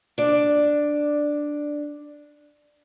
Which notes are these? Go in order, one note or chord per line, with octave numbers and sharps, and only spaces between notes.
D4 D5